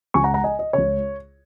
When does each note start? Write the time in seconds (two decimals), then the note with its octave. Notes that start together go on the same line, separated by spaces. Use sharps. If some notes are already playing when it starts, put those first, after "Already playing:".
0.14 C#2 C#3 G#5 C#6
0.24 F#5 A#5
0.34 F#5 A#5
0.44 D#5 G#5
0.59 D#5
0.73 C#2 C#3 C#5